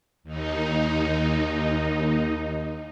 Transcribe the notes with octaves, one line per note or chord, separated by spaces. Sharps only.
D#2 D#4